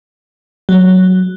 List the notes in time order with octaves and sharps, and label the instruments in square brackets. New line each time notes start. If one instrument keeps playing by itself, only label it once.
[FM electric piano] F#3